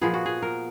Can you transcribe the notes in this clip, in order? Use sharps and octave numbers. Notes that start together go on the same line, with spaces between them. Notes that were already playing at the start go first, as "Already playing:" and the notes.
A#2 F3 B3 G#4
F#4
G#4
A#4